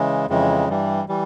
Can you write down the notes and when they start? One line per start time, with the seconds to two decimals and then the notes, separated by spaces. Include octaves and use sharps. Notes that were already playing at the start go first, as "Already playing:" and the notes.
Already playing: C#3 E3 G#3
0.29 F2 C#3 E3 G#3
0.69 G2 E3 G3
1.09 E3 G3